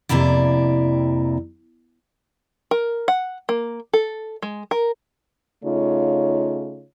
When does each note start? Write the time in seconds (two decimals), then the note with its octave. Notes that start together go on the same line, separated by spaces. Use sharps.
0.09 F2 C3 A#3 E4 D5
2.71 A#4
3.08 F#5
3.49 A#3
3.93 A4
4.42 G#3
4.71 A#4
5.64 C#3 A3 D#4 F4 C#5